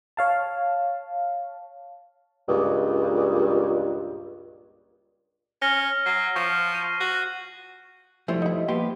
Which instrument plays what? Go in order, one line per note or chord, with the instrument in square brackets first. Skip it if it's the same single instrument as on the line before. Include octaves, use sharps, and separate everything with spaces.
[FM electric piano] C#5 F5 A5
[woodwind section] C#2 G2 A#2
[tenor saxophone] C#4 [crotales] F6 A#6 G7
[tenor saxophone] F#3 [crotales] C7
[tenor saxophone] F3 [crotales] C#6
[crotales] D#7
[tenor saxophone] F#4
[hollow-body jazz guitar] F3 G3 A3 [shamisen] E4 C5 C#5
[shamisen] D#4 E4
[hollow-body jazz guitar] A#3 B3 C6 [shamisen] G4